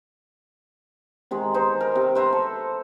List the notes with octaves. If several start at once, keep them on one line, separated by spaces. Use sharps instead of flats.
C3 D#3 G#3
D#4 B4 C5
A#4
C3
B4 C5 E5 A#5
A4